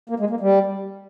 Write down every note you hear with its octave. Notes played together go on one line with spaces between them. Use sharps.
A#3
G#3
A#3
G3